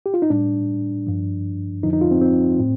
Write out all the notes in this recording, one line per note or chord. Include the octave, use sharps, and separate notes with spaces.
G4
F4
D#4
A2 G3 D4
G2 F3
F2 D3 F3 D#4
D#4
F4
C4
C4
A2